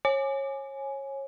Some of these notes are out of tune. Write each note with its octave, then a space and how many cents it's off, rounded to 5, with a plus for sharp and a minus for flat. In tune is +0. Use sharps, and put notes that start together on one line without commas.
C#5 -25 G#5 +10